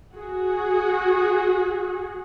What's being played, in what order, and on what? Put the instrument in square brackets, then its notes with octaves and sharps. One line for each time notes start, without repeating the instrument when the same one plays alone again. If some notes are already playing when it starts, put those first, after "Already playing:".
[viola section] F#4 G#4